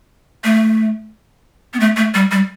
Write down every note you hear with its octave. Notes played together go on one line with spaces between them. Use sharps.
A3
B3
A3
A3
G3
G3